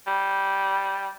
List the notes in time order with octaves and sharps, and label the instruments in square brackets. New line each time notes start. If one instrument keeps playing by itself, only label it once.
[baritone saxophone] G3